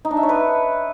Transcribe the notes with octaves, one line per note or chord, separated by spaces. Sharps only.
D#4
D4
E5
C#5
B4